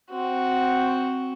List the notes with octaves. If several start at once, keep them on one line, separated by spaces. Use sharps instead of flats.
C4 F#4